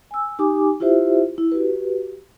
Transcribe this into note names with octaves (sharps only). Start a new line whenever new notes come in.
G#5 E6
D#4 G4 G#5 D6
E4 F4 G4 C5 E5
E4
F#4 G4 B4